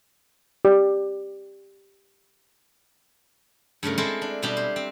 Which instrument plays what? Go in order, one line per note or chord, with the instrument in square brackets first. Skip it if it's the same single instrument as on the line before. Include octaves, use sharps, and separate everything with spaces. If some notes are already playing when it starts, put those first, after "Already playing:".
[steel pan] G4 D5
[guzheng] G2 C#3 A3 A#4
G#3 C4 E4 A4 A#4 C5
D4
B2 G3 D4 G4
C5
C4